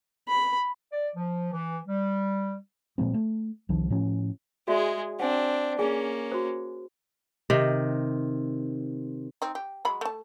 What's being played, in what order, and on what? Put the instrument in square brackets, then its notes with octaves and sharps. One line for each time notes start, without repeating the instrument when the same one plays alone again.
[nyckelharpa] B5
[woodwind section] D5
F3
E3
G3
[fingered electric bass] A#2 F3 G#3 C4
A3
C2 D#3 F3
A2 F3 C#4
[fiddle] G#3 G#4 [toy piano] F#4 D5 E5
[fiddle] C4 D4 [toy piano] F#5 G#5
[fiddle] A#3 C#4 [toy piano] G#4 G#5
[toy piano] F#4 C5
[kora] C3 D#3
[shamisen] C4 D#4
G4
F#3 G#3 B5
A3 A5